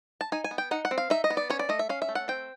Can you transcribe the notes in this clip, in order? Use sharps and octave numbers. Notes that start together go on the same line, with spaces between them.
A5
D#4 G#5
G#5
B3
G5
D#4 F#5
F#5
C4
F5
D#4 E5
D#5
B3
D5
C#4 C#5
D5
A3 D#5
E5
C#4 F5
E5
A3
F#5
C4 G5